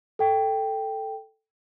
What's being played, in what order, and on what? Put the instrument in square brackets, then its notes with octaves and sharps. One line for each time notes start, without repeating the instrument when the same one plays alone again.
[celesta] A4 G5